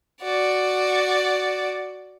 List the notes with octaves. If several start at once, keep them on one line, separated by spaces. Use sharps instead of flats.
F#4 D5